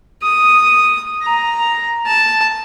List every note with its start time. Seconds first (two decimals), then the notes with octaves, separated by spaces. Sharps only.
0.23 D#6
1.22 A#5
2.07 A5